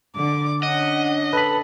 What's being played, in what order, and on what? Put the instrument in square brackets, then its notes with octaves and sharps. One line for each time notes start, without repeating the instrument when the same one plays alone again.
[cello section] D3 D5 [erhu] D6
[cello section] C#4 D4 [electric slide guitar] D#5 [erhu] F#5
[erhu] A4 [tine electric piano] B4 B5